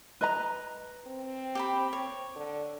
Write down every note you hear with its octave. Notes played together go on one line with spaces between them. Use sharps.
B4 D#5 A#5
C4
G4 G5 B5
C#5
D3